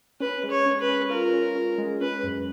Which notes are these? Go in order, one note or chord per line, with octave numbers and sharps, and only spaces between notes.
C#4 B4
G#3
C#5
C#4
B4
C#4
F4 A#4
C#4
C#4
G#3
C#4 B4
F#2